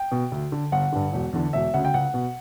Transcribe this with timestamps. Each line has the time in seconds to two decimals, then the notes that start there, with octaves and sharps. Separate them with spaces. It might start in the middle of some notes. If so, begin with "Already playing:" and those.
Already playing: G5
0.11 B2
0.32 D2
0.52 D3
0.72 G1 F#5
0.92 G2 D3
1.13 E1
1.33 E2 D3
1.53 E1 E5
1.74 D2 C#3 F#5
1.85 G5
1.94 C#2 F#5
2.14 B2